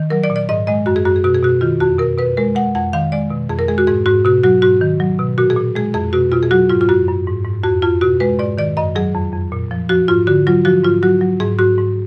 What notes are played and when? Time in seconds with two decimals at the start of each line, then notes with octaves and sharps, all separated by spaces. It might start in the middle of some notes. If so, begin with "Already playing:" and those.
Already playing: D#3
0.10 F#3 A#4
0.24 D5
0.30 A#2
0.36 D5
0.49 G#2 D#5
0.67 G#3 D#5
0.86 F#2 F#4
0.96 G#4
1.05 F#2 F#4
1.16 G#4
1.24 B2 F#4
1.35 G#4
1.43 B2 F#4
1.61 D#3 F4
1.81 F2 F#4
1.99 B2 A#4
2.18 B2 B4
2.37 G#3 A#4
2.55 G#3 F#5
2.75 F2 F#5
2.93 D#3 F5
3.12 G#3 D5
3.31 B2
3.49 F2 G#4
3.59 A#4
3.68 G#3 G#4
3.78 F#4
3.87 G#2 G#4
4.06 G#2 F#4
4.25 B2 F#4
4.44 F#3 F#4
4.62 G#2 F#4
4.81 D#3
5.00 F#3
5.19 B2
5.38 A#2 F#4
5.50 G#4
5.57 A#2
5.75 G#3 G#4
5.94 F2 G#4
6.13 B2 F#4
6.32 B2 F4
6.43 G#4
6.51 F#3 F#4
6.70 G#2 F4
6.81 F4
6.89 F#2 F#4
7.08 F#2
7.27 G#2
7.45 G#2
7.63 F2 F#4
7.82 F2 F4
8.01 B2 F#4
8.20 G#3 B4
8.39 G#2 D5
8.58 D#3 D5
8.77 F#2 D#5
8.95 F#3 G#4
9.15 F2
9.33 F2
9.52 A#2
9.71 F3
9.89 F3 F#4
10.08 G#2 F4
10.27 D3 F#4
10.47 F#3 F4
10.65 F3 F#4
10.84 G#2 F4
11.03 F#3 F#4
11.21 F#3
11.40 G#2 G#4
11.59 G#2 F#4
11.78 G#2